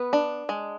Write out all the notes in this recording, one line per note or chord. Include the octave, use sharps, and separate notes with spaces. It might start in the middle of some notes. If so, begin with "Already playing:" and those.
Already playing: B3 B4
D4
G#3